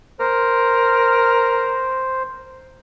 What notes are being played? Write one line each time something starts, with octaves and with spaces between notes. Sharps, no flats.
A#4 C5